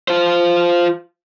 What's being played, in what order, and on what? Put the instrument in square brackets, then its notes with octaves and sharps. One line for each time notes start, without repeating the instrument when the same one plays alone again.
[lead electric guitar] F4 C5